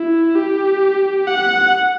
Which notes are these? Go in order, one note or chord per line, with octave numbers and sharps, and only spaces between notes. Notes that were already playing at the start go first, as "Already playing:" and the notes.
Already playing: E4
G4
F#5